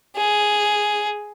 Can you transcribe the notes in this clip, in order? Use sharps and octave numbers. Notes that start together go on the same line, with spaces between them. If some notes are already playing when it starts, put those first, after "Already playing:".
G#4